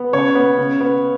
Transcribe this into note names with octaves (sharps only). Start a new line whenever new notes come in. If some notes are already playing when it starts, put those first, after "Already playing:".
Already playing: B3
C#3 C#5
B3
C#3
B3